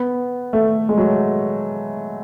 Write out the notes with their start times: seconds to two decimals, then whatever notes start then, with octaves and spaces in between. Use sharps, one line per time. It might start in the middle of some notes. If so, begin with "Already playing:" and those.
Already playing: B3
0.53 A3
0.89 G#3
0.98 F#3